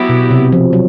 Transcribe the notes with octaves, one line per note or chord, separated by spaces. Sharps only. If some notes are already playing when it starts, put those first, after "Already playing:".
Already playing: F#3 B3 E4 G4
B2
C3
F3
F#3